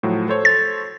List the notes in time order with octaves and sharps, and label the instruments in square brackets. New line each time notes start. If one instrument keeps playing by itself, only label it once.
[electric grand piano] A2 F3 F#3
A4 C5 C#5
[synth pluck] A6